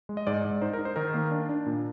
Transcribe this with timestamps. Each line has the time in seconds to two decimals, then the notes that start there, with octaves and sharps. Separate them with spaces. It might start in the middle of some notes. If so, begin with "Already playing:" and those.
0.09 G#3
0.17 D#5
0.27 G#2 D5
0.45 G#2
0.62 D#4 C5
0.73 A#4
0.79 D#4
0.85 C5
0.96 D#3 A#4
1.14 A#3
1.31 D4
1.49 D4
1.66 A#2